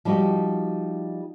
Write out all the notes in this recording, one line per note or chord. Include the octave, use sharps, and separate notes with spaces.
F3 G3 D#4 F#4 G4 D#5